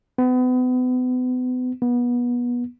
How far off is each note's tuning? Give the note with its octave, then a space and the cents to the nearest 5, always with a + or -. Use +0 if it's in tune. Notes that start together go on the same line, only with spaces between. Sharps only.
B3 +35
B3 -25